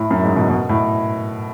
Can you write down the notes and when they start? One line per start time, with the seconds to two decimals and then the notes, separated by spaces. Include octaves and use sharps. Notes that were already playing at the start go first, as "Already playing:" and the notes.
Already playing: A2
0.10 F#2
0.23 G#2
0.36 B2
0.50 B2
0.69 A2